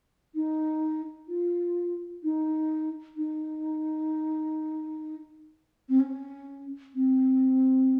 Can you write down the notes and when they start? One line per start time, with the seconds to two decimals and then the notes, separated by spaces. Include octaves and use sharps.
0.35 D#4
1.28 F4
2.23 D#4
3.17 D#4
5.89 C4
6.00 C#4
6.95 C4